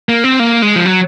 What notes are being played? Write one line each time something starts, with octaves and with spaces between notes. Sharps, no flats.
A#3
C4
A#3
G#3
F3
F#3